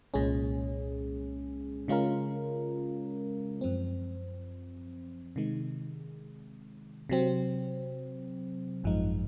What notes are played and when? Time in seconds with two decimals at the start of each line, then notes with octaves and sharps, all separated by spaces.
0.14 C2 A#2 G#3 C#4 G#4
1.88 C#3 G#3 C#4 F4 A#4
3.61 F#2 F3 C4
5.36 C3 D#3 G#3
7.09 C3 F#3 C4
8.84 G#1 F#2 F3 G#3 D#4